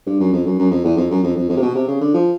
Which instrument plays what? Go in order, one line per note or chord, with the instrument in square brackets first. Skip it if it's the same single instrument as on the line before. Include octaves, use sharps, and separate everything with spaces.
[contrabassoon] G2
F#2
F2
F#2
F#2
F2
E2
F2
F#2
F2
F2
F2
C3
B2
C3
C#3
D3
F3